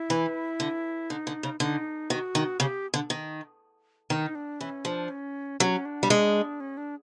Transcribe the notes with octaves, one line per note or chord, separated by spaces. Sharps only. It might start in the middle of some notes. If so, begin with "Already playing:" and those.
Already playing: E4
E3
D3
D3 D#4
D3
C#3
D3 D#4
D#3 F#4
D#3
C#3 G4
D3
D#3
D#3 D#4
D4
E3 C#4
F3 D4
C#4
F#3 C#4
D4
G3
G#3
C#4
D4